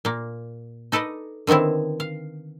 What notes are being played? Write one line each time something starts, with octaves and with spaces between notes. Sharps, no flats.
A#2 A#3
D#4 A4 B4 D5 D#5
D3 D#3 B3 C4 E4
F5